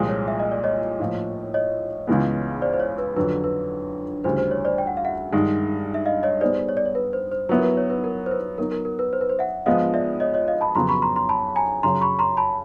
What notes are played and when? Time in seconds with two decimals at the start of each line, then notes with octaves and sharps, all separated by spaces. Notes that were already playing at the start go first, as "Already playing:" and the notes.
Already playing: C2 A#2 F3 G#3
0.09 C#5
0.28 E5
0.40 D#5
0.52 D5
0.64 C#5 D#5
0.99 A2 F3 A#3
1.54 C#5 D#5
2.07 C#2 C#3 E3 G#3 B3
2.62 C5 D5
2.73 C5
2.80 C#5
2.98 B4
3.16 F2 D3 F#3 B4
3.44 B4
4.24 D2 C#3 E3 G3 C5
4.38 C5
4.51 C#5
4.65 C5 D5
4.78 G5
4.87 F#5
4.97 F5
5.05 E5 F#5
5.32 G2 D#3 G#3
5.94 E5
6.06 D#5 F5
6.23 C#5 D#5
6.41 G3 B3 D#4 G#4 C5 D5
6.69 C#5
6.77 D5
6.86 C#5
6.95 B4
7.13 C5
7.32 C5
7.49 F#3 B3 E4 B4
7.58 A#4
7.64 B4
7.77 C#5
7.90 B4
8.04 A#4
8.26 C5
8.31 B4
8.58 F#3 B3 D#4 A#4
8.72 A#4
8.85 A#4
8.99 B4
9.13 C5
9.21 B4
9.29 C5
9.39 E5 F#5
9.66 F3 G#3 B3 D#5 F5
9.94 D5 E5
10.20 C#5 D#5
10.34 C#5 D#5
10.48 D#5 F5
10.61 A5 B5
10.75 F2 C#3 F#3 B3 A#5 C6
10.89 B5 C#6
11.02 A#5 C6
11.16 A#5 C6
11.29 A5 B5
11.56 G#5 A#5
11.83 F#2 C#3 F#3 A#5 C6
12.01 B5 C#6
12.19 A#5 C6
12.37 A5 B5